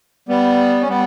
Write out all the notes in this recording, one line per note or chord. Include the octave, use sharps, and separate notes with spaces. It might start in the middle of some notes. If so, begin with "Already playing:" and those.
G3 B3
C#4
G3 B3